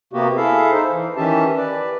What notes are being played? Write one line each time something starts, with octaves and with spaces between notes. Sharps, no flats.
C3 A#3 B3 F#4 G4
E4 G#4 A4 E5 F5
D#4 C5
E3
D#3 E3 C#4 G4 E5 A5
B4 D5